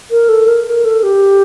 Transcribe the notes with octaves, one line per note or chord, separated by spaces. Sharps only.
A#4
A4
A#4
A#4
A4
G4